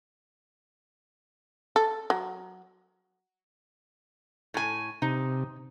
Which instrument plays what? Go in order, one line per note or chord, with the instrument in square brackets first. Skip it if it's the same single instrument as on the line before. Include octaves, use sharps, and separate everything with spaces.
[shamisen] A4
F#3
[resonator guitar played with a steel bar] A2 G#5
[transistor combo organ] C3 [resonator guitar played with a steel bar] D#4